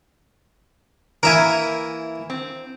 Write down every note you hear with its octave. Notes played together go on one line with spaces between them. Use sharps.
E3 A#3 E4 A#4 E5 G#5
C4